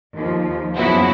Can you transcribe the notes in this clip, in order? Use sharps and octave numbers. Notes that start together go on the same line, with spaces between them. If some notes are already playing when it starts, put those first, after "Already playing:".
D#2 F3
F#2 C#3 F3 B3 E4 F#4